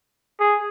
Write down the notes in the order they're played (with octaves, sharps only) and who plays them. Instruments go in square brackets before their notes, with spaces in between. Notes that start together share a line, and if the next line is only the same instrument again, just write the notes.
[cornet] G#4